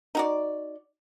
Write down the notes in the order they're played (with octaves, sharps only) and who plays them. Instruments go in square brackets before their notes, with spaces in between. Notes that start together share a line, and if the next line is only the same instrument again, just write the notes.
[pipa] D#4 F#4 D5